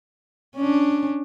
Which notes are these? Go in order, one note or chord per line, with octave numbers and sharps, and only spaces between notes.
C#4 D4